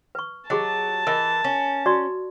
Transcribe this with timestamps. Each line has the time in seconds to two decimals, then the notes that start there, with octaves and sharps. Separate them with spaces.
0.15 B4 C#6
0.50 F#3 G4 G#4 D#5 A5
1.07 E3 A#4 D#5 E5
1.44 C#4
1.86 F#4 D5 C#6